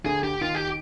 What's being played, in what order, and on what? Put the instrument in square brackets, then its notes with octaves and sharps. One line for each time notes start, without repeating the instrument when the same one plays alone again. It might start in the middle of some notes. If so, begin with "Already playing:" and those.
[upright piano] D2 D3 [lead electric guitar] G#4
[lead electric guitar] G4
[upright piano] D#2 D#3 [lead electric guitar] F4
[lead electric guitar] G4